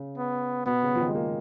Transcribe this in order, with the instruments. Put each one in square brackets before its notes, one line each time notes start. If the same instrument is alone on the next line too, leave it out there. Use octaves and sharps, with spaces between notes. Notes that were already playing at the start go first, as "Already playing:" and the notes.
Already playing: [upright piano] C#3
[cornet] B3
[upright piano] B2 [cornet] B3
[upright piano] C#3
F3
D#3
G#3
A#3